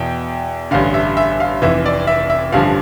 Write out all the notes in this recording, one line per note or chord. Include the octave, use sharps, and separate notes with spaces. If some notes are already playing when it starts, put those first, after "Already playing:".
Already playing: E2 B2 G5
A1 G2 D3 F5
E5
E5
F5
F1 F2 E3 E5
D5
E5
E5
A1 G2 D3 F3 F5